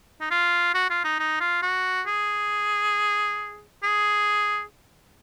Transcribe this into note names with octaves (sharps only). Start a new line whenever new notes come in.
D#4
F4
F#4
F4
D#4
D#4
F4
F#4
G#4
G#4